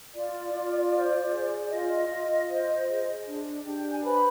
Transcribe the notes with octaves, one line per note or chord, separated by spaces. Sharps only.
F4 D5
F4
C5
G#4
D5
F4 D#5
F4
C5
G#4
D4
D4 G4 G5
G5
G#5
B4 C5 B5